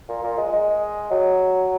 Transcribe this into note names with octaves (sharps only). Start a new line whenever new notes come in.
A#2
A#2
G#3
G#3
F#3